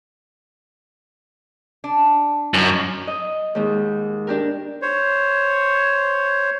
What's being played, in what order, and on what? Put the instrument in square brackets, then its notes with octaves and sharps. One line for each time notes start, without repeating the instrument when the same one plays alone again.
[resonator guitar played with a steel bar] D4
[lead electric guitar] F#2 [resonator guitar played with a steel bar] D#3 D#4
[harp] D#5
D#2 G#2
D4 G4 A#4
[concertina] C5 C#5